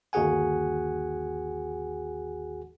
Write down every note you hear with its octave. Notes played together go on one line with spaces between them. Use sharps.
G1 D#2 F#4 G#4 F#5 G#5